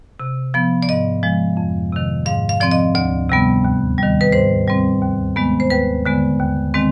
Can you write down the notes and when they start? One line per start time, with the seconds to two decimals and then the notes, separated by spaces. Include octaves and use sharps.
0.20 C3
0.54 F3 B3
0.83 D5
0.89 G#2 D#5
1.23 F3 G#3
1.57 F2
1.92 C3 D#3
2.26 G#2 F5
2.49 F5
2.60 F3 C4 D5
2.71 D#5
2.95 D2 D5
3.30 C3 G3 B3
3.64 D#2
3.98 D#3 G3
4.21 B4
4.32 G#2 C5
4.67 G3 C4
5.02 D#2
5.36 D#3 G#3 B3
5.60 C5
5.70 D#2 B4
6.06 D3 G#3 B3
6.40 D#2
6.74 D#3 G#3 C4